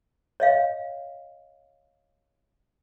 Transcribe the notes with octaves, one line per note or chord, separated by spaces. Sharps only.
C#5 D#5 F5